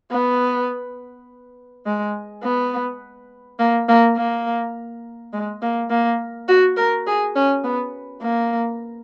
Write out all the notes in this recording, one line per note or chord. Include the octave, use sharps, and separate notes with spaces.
B3
G#3
B3
A#3
A#3
A#3
G#3
A#3
A#3
F#4
A#4
G#4
C#4
B3
A#3